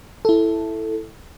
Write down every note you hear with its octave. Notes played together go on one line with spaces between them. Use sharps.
E4 A4